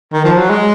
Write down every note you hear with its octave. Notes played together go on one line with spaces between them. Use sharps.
D#3
F3
F#3
G#3